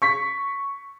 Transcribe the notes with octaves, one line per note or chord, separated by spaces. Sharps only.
C#6 B6